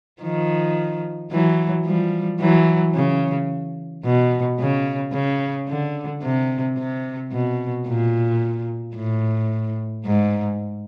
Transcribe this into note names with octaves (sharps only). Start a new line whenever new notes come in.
D#3 F3
E3 F#3
F3 G3
E3 F#3
C#3
B2
C#3
C#3
D3
C3
C3
B2
A#2
A2
G#2